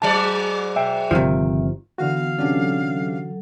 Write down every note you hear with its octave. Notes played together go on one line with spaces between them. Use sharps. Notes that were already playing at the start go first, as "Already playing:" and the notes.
G#2 F#3 D5 A5
E5 G5
G1 C3 D#3 F3
D3 E3 B3 F#4 F5
C3 F#3 C#4 D4 A4